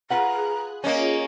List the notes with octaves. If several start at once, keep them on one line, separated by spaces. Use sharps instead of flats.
F4 G#4 B4 F#5 A#5 F#6
A#3 C#4 F4 G#4 C#5 D#5